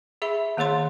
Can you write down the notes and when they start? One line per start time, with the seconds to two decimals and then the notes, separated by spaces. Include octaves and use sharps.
0.22 G#4 E5 B5
0.57 D#3 A#3 G#4 C#5 C6